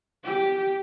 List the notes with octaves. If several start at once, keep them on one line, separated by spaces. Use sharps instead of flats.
G4